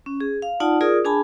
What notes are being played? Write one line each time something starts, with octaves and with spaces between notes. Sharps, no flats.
C#4
G#4
F5
D#4 F4 D5 F#5 A5
F4 G#4 A#4 D5 D#6
D4 G#4 G#5 A5 B5